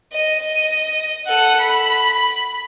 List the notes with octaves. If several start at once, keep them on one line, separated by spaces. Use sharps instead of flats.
D#5
A4 F#5
B5